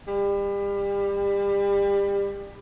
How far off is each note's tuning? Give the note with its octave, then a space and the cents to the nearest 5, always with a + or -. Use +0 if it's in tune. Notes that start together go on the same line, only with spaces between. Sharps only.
G3 +30